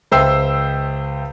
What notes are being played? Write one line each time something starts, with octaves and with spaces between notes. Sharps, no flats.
C#2 C5 E5 G5 E6 C7